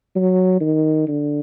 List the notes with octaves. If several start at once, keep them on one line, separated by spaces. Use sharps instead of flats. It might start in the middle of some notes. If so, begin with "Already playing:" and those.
F#3
D#3
D3